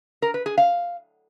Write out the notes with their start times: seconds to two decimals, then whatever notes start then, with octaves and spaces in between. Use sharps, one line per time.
0.22 A#4
0.34 B4
0.46 G#4
0.58 F5